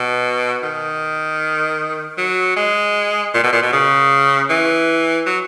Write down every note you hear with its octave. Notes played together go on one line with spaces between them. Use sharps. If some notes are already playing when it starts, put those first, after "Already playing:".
Already playing: B2
D#3
F#3
G#3
A#2
B2
A#2
B2
C#3
E3
F#3